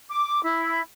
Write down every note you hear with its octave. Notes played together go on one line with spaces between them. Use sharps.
D6
E4